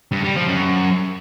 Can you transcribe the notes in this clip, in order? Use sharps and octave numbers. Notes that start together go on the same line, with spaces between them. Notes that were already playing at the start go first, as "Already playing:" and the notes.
G2
G3
F3
F#2